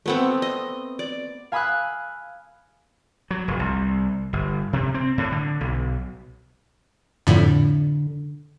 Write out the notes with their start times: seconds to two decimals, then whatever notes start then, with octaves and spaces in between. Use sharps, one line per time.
0.06 A3 B3 C4
0.42 D#5
0.99 D5
1.52 F5 G#5 B5 D#6 E6 F#6
3.31 F#3
3.48 F1
3.59 C2
4.33 G1
4.73 C3
4.94 C4
5.18 A2
5.32 D3
5.61 B1
7.27 F2 A2 D3